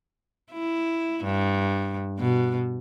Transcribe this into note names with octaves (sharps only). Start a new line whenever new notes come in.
E4
G2
B2